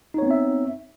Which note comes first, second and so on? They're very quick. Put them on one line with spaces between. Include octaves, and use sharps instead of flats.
D#4 C#5 B3 C4 E5